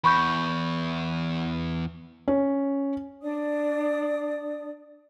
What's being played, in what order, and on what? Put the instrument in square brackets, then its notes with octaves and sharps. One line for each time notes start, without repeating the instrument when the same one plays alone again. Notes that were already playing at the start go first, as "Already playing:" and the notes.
[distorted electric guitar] E2 [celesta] B5 C#6 G6
[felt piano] C#4
[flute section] D4 D5 D#6